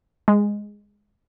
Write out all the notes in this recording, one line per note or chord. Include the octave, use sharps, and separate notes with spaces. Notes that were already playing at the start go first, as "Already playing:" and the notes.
G#3